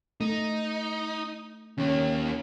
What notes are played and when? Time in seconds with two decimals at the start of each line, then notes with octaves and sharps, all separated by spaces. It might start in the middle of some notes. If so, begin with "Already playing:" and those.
0.21 A3 D#4
1.78 D#2 D#3 C#4